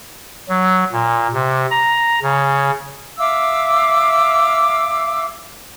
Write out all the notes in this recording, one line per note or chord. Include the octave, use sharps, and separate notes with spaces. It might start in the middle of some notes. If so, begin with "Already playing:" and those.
F#3
A#2
C3
A#5
C#3
E5 F5 D6 E6